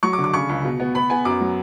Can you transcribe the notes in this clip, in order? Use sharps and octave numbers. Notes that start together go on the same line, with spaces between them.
F#3 C#6
D6
D3
D6
C#3 C#6
C#2
B2
B3
B3 B5
B3 G#5
F#2 D6
F#3